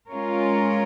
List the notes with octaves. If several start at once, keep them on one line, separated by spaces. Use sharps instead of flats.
G#3 C#4 F4 A#4 C#5